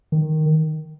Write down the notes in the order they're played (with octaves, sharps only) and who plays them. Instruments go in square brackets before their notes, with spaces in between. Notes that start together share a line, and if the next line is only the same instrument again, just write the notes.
[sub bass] D#3